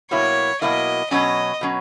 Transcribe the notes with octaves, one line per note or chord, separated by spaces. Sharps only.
B2 F#3 A#3 E4 C#5
B2 F#3 A#3 E4 D#5
B2 F#3 C#4 D#5
B2 F#3 C#4